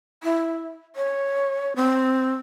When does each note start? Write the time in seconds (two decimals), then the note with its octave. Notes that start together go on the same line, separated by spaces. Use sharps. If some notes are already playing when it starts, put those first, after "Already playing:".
0.23 E4
0.96 C#5
1.76 C4